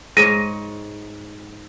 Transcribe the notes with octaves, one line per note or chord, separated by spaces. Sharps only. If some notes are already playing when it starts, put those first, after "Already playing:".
G#2 C#5 A#6 D#7